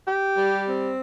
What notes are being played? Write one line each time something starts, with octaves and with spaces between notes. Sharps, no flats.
G4
G3
C4